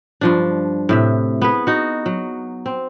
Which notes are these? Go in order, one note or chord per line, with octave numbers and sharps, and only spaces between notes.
G2 F3 D4
A2 C3 E5
B3 G#4 B4
D#4 F#4
F#3
C4